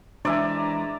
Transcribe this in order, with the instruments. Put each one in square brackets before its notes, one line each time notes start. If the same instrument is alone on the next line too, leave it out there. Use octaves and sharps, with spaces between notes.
[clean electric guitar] E3 G#3 C5 [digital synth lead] D4 [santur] D5 E5 G#5 [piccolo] A#5